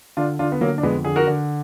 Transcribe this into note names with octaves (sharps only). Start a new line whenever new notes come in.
D3 D4 F4
D3 D4 F4
B3
D3 F#3 A#3
D4
F2 G#3 B3
D3 G#4
F#4 A#4
D3